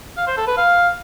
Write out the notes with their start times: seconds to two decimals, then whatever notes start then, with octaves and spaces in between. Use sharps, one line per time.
0.17 F5
0.27 C5
0.37 A4
0.47 B4
0.57 F5